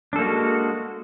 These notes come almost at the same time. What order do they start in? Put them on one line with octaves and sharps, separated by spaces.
D4 A4 A#3 F#4 G#3